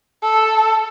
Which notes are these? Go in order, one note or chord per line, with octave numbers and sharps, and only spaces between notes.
A4